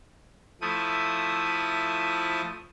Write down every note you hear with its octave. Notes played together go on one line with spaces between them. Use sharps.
F3 A3 E4 D#6